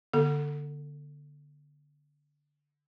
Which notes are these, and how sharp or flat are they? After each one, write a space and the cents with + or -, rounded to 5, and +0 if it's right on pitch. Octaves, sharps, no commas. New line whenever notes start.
D3 -10 B3 -35 A4 +15